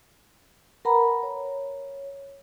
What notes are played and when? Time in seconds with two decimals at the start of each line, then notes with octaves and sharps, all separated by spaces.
0.85 A#4 B4 F#5 A#5 B5
1.23 C#5